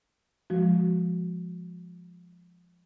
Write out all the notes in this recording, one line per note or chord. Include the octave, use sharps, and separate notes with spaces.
F3 G#3 F#4